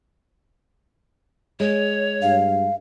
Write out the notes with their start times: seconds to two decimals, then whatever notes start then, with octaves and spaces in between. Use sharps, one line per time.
1.60 G#3 C#5
2.22 G2 F5